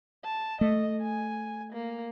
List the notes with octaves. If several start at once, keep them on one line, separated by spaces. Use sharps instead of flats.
A5
A3 D#5
G#5
A#3